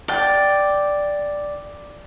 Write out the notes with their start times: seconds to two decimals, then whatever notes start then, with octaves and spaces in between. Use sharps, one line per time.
0.08 D5 G5